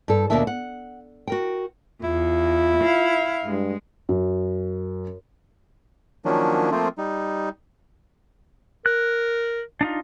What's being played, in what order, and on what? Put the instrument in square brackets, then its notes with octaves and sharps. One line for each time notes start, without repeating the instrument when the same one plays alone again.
[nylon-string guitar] G2 A4
D#2 B2 A#3 D4 E5 A5
F#5
F#4 A#4 G5
[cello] E2 [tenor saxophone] E4 [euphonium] F4
[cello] F5
[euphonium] G2 [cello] G#3
[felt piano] F#2
[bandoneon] D#3 F3 F#3 A#3 C#4 D4
F3 A3 A#3 C4 F4
G3 D#4
[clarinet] A#4 [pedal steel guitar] F#6
[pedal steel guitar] D4 D#4 F4